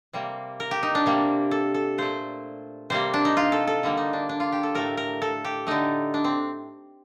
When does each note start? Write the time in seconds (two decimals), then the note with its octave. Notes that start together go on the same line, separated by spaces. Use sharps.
0.13 C3 G3 A#3
0.60 A#4
0.71 G4
0.83 D#4
0.95 D4
1.06 C3 G3 A#3
1.51 A4
1.74 A4
1.98 A#2 A3 C5
2.90 C3 G3 A#3 C5
3.14 D4
3.25 D#4
3.37 F4
3.52 A4
3.67 A4
3.83 D3 G3 A#3
3.97 D#4
4.13 D4
4.29 D4
4.40 F4
4.52 G4
4.63 A4
4.75 A2 A3 A#4
4.97 A#4
5.22 A4
5.45 G4
5.67 D3 A3 D#4
6.14 D4
6.24 C4